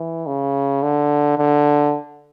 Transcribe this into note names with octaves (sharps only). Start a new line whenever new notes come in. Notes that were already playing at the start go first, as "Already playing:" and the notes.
Already playing: E3
C#3
D3
D3